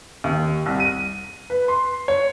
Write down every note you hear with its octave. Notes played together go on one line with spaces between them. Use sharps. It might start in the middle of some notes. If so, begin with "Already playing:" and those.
D#2
C2
D#7
B4
C6
C#5